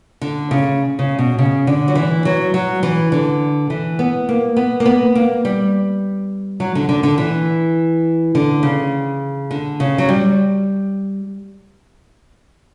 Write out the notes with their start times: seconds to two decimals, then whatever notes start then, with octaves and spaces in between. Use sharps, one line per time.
0.21 D3
0.51 C#3
0.99 C#3
1.19 B2
1.39 C#3
1.67 D3
1.88 F#3
1.95 E3
2.25 F#3
2.54 F#3
2.83 E3
3.12 D3
3.70 E3
3.99 B3
4.29 A#3
4.57 B3
4.80 A#3
4.86 B3
5.15 A#3
5.45 G3
6.60 F#3
6.75 D3
6.89 D3
7.03 D3
7.18 E3
8.35 D3
8.63 C#3
9.51 D3
9.80 C#3
9.98 F#3
10.09 G3